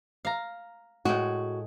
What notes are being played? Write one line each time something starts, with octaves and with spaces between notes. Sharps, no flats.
F5 A#5
A2 G#3 F#4